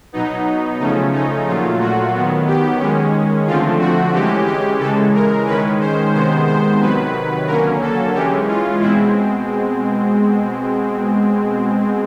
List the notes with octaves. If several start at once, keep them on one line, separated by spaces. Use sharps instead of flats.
B2 F#3 B3 D#4
C#3 F3 A3 C#4 D#4
D#4
A#2 F#3 A3 F4
F#4
D#3 F#3 B3
G4
D#3 G#3 C#4
D3 F3 A3 C4 F4
F#4
E3 G#3 C#4 G4
G4
C#3 E3 G#3 A4
A#4
D#3 G#3 C#4 B4
C5
C3 D#3 G#3 B3 C5
C5
C3 D#3 F#3 B4
D3 F#3 A#3 C#4 A#4
A4
E3 G#3 C#4 G4
F4
B2 G#3 C4 E4